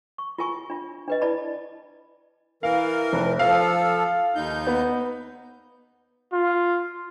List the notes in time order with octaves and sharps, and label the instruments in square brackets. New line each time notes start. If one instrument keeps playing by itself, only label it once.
[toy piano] C#6
F4 A#4 G#5 C#6
D4 F4
D4 B4 D#5
E4 D5 A5 B5
[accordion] E3 A#4 [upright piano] F5
[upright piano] F1
[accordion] F3 A4 [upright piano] F5
[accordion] D#2 D#4 G6
[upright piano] B3
[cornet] F4